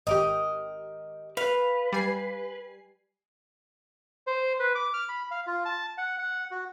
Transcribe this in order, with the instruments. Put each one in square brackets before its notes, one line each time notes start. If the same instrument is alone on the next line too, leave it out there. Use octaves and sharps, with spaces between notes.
[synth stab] G#1 G4 [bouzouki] A#4 D#5
[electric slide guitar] B4 [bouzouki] F5
[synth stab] G3 G#5 C7
[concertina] C5
B4
D6
F6
B5
F5
F4
A5
F#5
F#5
F#4